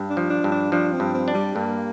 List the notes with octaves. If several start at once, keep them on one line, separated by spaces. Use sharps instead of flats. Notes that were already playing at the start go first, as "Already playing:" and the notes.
Already playing: G2
D4
F3
D4
G2
D4
F3 D4
C4
G2
C4
D4
G3
G2 A#3